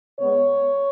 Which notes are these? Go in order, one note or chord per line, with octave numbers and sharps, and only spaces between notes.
C#3 G#3 B3 C#5